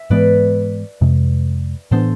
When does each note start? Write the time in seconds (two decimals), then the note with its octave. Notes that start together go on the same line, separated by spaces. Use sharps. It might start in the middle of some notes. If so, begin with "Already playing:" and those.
Already playing: E5
0.10 G#2 E3 G#3 B3 B4 D5
1.01 F2 C3 G#3
1.91 A2 E3 B3 D4 A4 C5